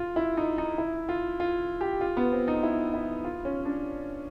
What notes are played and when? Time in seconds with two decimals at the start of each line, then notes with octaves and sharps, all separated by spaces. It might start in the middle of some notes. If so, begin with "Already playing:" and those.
Already playing: F4
0.16 E4
0.37 D#4
0.58 D#4
0.78 E4
1.09 F4
1.40 F4
1.81 G4
2.01 F4
2.17 B3
2.32 C4
2.48 D#4
2.63 E4
2.94 E4
3.25 F4
3.45 C#4
3.65 D4